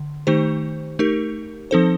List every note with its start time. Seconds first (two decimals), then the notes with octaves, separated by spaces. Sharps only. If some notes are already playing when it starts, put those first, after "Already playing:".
Already playing: D3
0.27 D#3 A3 D#4 G4 C5
0.99 A3 D#4 G4 A#4
1.71 F3 C4 D#4 A4 C5